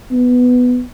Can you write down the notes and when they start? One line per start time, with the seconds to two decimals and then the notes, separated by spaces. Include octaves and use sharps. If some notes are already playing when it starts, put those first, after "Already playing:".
0.11 B3